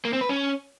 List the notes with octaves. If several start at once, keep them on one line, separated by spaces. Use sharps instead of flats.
A#3
C4
B4
C#4